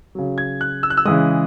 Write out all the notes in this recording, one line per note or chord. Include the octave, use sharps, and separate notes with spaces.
C#3 F#3
G#6
F#6
E6
F#6
E6
C#3 E3 G#3 D#6